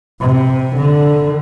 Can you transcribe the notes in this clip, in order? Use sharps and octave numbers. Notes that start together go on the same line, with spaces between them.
C3
D3